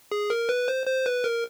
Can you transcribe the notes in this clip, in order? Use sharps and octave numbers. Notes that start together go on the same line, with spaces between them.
G#4
A#4
B4
C5
C5
B4
A#4